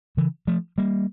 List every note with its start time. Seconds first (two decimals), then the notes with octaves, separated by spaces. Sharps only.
0.17 C#3 E3
0.47 F3 A3
0.78 G3 A#3